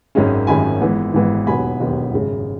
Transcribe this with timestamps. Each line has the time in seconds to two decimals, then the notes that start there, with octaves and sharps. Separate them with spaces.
0.15 G#1 F#2 D#3 G#3 C#4
0.47 G#1 F#2 D#3 G#3 C#4 G#5 B5
0.81 G#1 G#2 E3 B3
1.14 G#1 G#2 E3 B3
1.47 E1 D#2 D#3 F#3 B3 G#5 B5
1.80 E1 D#2 D#3 F#3 B3
2.12 G#1 F#2 C#3 G#3